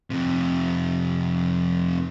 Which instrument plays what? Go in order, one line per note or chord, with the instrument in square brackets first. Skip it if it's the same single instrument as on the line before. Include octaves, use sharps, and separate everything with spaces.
[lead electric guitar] F2 C3